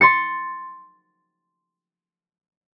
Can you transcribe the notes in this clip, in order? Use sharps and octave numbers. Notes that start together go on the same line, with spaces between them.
C6 A6 C#7